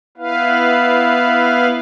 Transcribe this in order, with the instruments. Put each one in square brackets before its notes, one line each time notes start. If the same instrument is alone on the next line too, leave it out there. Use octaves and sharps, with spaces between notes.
[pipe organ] B3 E4 B4 F5